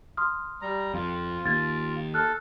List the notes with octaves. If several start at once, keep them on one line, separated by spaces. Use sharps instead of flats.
C6 D#6 F6
G3 A#5
F2 F4
D#2 G#6 A6
A4 F6 F#6